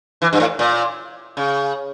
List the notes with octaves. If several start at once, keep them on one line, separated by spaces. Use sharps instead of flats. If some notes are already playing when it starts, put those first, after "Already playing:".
E3
G2
A2
A#2
C#3